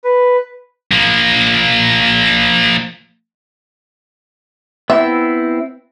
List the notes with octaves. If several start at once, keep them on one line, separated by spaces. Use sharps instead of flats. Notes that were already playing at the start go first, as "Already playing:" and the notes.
B4
F3 A#3
B3 C4 E4 E5